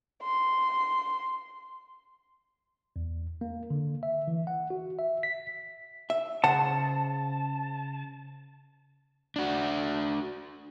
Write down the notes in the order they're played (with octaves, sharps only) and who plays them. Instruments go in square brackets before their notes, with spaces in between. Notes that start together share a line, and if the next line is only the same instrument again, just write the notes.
[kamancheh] C6
[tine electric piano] E2
A#3
D3
E5
E3
F#5
F#4
E5
B6
[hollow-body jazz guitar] E5
[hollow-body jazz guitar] C#3 C5 F#5 [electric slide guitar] A5
[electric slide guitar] D4 F#4